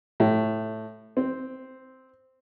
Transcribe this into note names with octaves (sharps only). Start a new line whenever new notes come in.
A2
C4